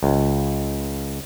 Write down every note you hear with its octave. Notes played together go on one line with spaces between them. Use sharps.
C#2